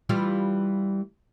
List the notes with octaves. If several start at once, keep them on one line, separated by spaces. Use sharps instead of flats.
E3 G3 F4